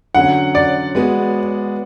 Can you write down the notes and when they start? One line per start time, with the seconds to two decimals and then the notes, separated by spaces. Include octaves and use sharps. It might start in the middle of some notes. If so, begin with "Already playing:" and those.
0.15 D3 F#3 C#4 F#5
0.55 D5
0.95 G#3 B3 F#4